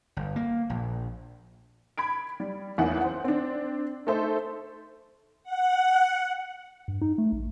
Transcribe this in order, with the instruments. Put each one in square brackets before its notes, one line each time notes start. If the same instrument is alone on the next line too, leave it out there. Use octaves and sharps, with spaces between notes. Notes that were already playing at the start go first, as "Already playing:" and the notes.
[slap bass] G1
A#3
A#1
[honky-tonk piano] B5 G#6 D7
G3
A1 E2 D#3 E3 A#3 F#5
C5 F#5
C4 D4
A3 D#4 A4 C5 E5
[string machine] F#5
[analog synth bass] G2
D#4
A3
A#1